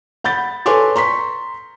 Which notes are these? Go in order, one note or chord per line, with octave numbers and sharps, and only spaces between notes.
F#5 B5 G6 A6
A4 B4 C#5 G#5 C6 D6
A#5 C6 C#6 B6